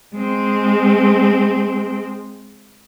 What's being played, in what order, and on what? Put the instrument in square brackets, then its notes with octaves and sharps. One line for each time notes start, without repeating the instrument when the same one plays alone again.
[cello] G#3 C4